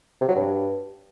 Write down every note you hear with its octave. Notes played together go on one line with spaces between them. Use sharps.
C3
F#3
G2